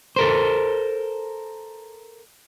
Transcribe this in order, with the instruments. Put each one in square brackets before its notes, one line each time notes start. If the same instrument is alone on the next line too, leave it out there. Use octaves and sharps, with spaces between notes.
[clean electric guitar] A4 A#4 C5